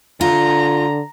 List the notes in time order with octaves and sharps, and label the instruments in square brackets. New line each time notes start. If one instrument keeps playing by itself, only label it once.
[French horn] D3 [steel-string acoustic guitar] F4 [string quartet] A#5